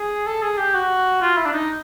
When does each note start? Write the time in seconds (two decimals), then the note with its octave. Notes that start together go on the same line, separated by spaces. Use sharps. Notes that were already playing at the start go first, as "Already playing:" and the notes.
Already playing: G#4
0.26 A4
0.42 G#4
0.58 G4
0.75 F#4
1.21 F4
1.37 E4
1.46 D4
1.53 D#4